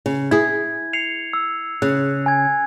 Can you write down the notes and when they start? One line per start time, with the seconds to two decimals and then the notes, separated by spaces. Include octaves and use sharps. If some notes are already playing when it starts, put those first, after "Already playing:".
0.06 C#3
0.31 E4 G#4 G#6
0.93 C7 C#7 F7
1.33 E6
1.82 C#3 F#6
2.26 G#5 G#6